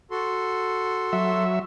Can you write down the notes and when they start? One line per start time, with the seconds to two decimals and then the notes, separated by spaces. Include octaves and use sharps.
0.11 F#4 A4 C6
1.13 F#3 E5